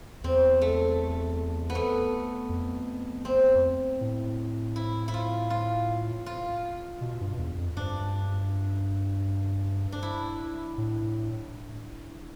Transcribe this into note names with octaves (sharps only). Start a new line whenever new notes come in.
E2 C4
A3
B3
A3
F2
C4
A2
E4
E4
F4
F4
F4
B2
G2
E2
F2
G2 D4
D4
E4
A2